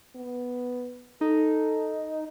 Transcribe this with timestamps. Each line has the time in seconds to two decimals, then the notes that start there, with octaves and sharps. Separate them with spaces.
0.16 B3
1.21 D#4 A4